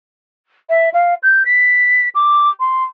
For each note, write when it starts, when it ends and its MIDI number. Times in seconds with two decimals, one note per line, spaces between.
0.69 0.89 76
0.93 1.14 77
1.23 1.43 91
1.45 2.08 95
2.15 2.49 86
2.59 2.83 84